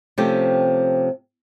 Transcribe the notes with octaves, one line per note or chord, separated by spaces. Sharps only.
C3 F3 A3 C#4 G4